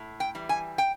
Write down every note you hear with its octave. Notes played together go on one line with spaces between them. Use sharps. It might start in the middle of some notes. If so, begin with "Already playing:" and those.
Already playing: A2
G5
E3 G3
G#5
G5